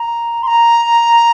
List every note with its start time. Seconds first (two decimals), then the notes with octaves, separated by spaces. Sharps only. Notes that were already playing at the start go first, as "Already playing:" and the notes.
Already playing: A#5
0.43 C6
0.47 A#5